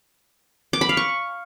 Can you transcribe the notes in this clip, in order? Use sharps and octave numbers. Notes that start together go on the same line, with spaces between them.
D6
B5
F5
C#6